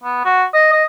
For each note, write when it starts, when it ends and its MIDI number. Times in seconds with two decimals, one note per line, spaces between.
0.04 0.21 59
0.25 0.45 66
0.54 0.71 75
0.73 0.84 75